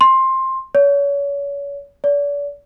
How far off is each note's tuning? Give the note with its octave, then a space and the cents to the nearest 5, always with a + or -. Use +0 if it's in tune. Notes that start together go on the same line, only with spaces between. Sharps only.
C6 +15
C#5 +35
D5 -40